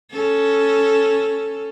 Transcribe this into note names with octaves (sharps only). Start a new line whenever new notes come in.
C#4 A4